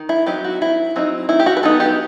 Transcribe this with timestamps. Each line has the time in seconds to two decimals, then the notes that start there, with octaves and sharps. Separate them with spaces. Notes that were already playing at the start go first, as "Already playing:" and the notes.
Already playing: D#3
0.09 E4
0.26 F#3 C4 D#4 G4
0.44 F#4
0.61 D#3 E4
0.96 F#3 C4 D#4
1.29 D#3 E4
1.39 G4
1.46 F#4
1.57 B4
1.63 F#3 B3 D#4 A4
1.80 G4